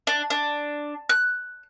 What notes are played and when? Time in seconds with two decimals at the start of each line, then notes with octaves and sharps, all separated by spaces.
0.07 D4
0.30 D4
1.09 F#6